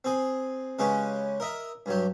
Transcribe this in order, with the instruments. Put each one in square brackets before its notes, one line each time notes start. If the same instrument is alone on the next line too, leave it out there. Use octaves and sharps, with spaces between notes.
[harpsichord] C4 G#4
C#3 G#3 C#4 G4 B4
A#4 D#5 E5
G2 F#3 G4